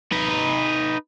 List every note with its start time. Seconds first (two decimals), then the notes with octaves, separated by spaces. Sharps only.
0.12 D#4 B4